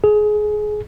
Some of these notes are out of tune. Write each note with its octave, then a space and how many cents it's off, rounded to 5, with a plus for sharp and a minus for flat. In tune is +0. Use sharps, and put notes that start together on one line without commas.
G#4 +20